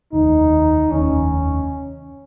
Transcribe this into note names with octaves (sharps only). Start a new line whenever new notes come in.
F1 D#2 D#3 D#4
F1 D#2 D#3 C#4